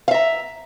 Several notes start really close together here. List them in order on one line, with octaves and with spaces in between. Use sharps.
F5 E5 A#5